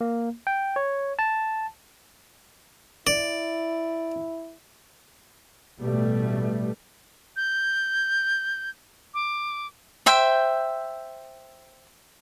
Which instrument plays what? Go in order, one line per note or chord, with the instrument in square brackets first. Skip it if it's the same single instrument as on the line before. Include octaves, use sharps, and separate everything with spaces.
[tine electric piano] A#3
G5
C#5
A5
[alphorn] E4 [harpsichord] D5
[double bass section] A1 B2 G3 A3
[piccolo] G6
D6
[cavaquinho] C5 E5 G5